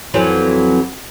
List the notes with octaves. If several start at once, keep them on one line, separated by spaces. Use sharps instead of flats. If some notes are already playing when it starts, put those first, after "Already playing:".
F2 E3 F#3